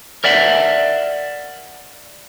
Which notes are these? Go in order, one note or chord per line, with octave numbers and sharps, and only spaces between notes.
A#4 D5 E5 F#5